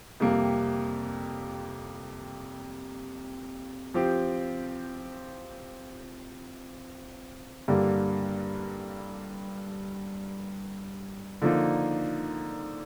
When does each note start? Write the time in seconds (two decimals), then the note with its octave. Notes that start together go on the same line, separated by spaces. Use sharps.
0.20 F2 C3 G3 A#3
3.94 F3 C4 G4
7.68 G2 D3 G3 A#3
11.42 D3 F3 A#3 D#4